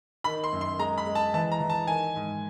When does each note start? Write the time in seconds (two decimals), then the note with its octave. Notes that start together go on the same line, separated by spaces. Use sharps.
0.24 D#3 B5
0.44 C6
0.53 F#2
0.61 C6
0.79 G#3 A#5
0.98 B5
1.06 G#3
1.15 A5
1.34 E3 A5
1.52 A#5
1.60 E3
1.70 A5
1.87 D#3 G#5
2.16 G#2